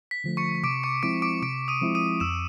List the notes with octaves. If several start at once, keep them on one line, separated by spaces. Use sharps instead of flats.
B6
D3 F3 A3
C#6 C#7
C3 D6 D7
C#6 C#7
F3 G#3 C4 E4 D6 D7
D6 D7
C3 D6 D7
D#6 D#7
F3 G#3 C4 E4
D#6 D#7
F2 E6 E7